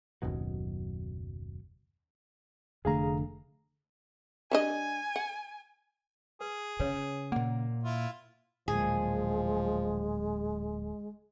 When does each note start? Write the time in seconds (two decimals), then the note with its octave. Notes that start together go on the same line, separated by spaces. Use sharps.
0.22 F#1 D#2 B2 F#3
2.85 F1 D3 A3 G#4 F5 A#5
4.51 G3 D4 D#5 G#5
5.16 F#5
6.41 G#4 B4
6.80 C#3 B4 C#5
7.32 A#2 A#3 F#5
7.84 E4 F4
8.68 D1 A#2 F3 G#3 G#4